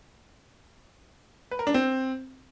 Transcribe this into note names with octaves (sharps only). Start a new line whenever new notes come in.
B4
A#4
D4
C4